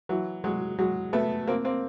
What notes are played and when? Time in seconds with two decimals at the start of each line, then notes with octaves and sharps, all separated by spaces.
0.09 E3 F#3
0.44 F#3 G#3
0.79 F#3 G#3
1.13 A3 B3
1.47 A#3 C4
1.64 A#3 C4